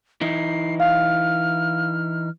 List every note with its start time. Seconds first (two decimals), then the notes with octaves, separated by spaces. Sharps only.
0.21 E3 D#4 E4 C7
0.80 F5 F6